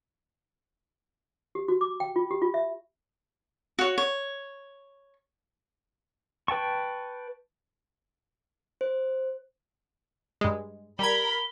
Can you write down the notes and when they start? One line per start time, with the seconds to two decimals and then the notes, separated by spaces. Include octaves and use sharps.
1.55 G4
1.68 F#4
1.81 D6
2.00 G5
2.16 F4
2.31 G4
2.42 F4
2.54 E5
3.79 F#4 C#5
3.98 C#5
6.48 B4 G5 A5 C#6
8.81 C5
10.41 G2 G#3
10.99 G3 A#4 B5 G#6 G7